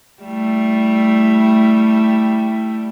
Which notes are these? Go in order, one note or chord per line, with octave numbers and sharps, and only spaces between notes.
G3 A3 E4